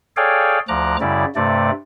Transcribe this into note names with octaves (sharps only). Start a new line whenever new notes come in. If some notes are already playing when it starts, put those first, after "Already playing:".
G#4 A4 C#5 D5 F5 G5
D2 F3 A#5 D6 F#6
F#2 C#3 G3 E4 D5
G2 C3 A3 D5